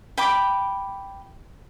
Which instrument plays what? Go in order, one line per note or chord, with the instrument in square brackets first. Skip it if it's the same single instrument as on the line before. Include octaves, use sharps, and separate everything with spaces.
[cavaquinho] G5 B5 D6